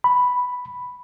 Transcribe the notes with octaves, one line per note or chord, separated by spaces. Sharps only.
B5